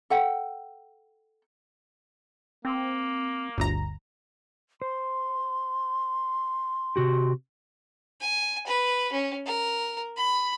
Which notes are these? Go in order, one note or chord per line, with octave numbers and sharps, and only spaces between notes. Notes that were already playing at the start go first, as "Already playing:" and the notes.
A4 F#5 G5
A#3 C4
G1 D2 A#5
C5 C6
C3 F#4 G4
G#5
B4
C#4
A#4
B5